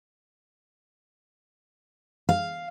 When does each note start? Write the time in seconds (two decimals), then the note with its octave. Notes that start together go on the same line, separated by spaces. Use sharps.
2.29 F5